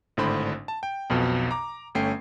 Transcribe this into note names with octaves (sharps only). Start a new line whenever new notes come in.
G#1 A2 D3 D4 C5 B5
A5
G5
B1 F2 B2
A#5 D6
G1 A3 C#4 G5 C7